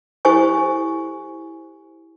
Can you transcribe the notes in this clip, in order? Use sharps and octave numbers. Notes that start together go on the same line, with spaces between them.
E4 G4 A4 C5 G#5 C#6